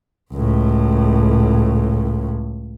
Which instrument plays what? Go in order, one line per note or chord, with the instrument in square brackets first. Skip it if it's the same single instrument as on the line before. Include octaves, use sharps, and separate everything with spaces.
[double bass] C#2 A2